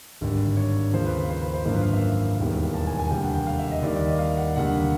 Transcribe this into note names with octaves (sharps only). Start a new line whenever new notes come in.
G#1 G2 D3 G3
C#5
D#2 C#3 F3 C5
B4
B4
C5
B4
C5
G#1 F#2 D3 F3 A#3 C5
B4
F5
E5
E1 D#2 D#3 G3 B3
A5
G#5
G#5
F1 D#2 D3 G3 G5
F#5
G5
F5
E5
D#5
D#2 D#3 G3 D5
D5
D#5
F5
F#5
F1 D#2 D3 G3 F#5